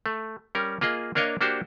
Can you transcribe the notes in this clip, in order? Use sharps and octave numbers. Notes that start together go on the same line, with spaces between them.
A3
G3 C#4 A#4
A#3 F4 G#4 D#5
A#3 D4 A#4 C#5 D#5 F5
A#3 D4 F#4 G4 C5